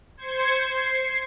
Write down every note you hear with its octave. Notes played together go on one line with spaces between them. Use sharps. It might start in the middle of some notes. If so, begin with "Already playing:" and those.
C5 G#6 C#7
C7